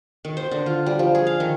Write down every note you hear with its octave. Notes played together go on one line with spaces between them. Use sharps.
D#3
C5
D3
F4
G3
F3
G#4
F5
D#3